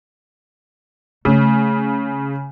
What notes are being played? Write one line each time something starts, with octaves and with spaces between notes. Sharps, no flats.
C#3 A3